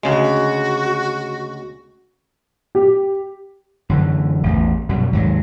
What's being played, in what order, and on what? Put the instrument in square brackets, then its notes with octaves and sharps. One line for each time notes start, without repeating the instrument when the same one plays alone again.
[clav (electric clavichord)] D2 C#3 G#3 [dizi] F#4
[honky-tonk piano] G4
[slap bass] F#2 D3 E3
A1 E2
F#2 B2 G3
D#2 G#2 F#3